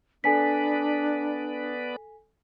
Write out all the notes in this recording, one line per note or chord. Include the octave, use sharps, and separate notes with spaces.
B3 D4 A4 B4 D5 G#5 B6